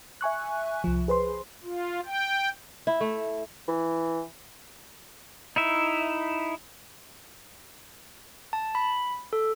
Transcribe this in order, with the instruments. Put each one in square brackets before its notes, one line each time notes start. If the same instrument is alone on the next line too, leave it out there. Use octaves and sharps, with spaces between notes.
[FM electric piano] E5 G#5 C#6 F#6
C2 F3
G#4 B4 C5 C6
[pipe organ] F4
G5
[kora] E4
A3
[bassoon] E3
[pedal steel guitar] D#4 E4 E5
[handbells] A5
B5
A4